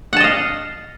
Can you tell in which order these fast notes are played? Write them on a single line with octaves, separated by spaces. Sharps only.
F#5 A5 D#5 F5